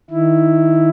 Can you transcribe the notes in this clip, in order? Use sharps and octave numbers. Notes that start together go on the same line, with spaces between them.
D#3 E4